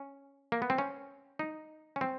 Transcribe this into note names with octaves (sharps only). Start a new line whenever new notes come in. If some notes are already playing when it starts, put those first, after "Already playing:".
Already playing: C#4
A#3
B3
C4
C#4
D#4
C#4
C4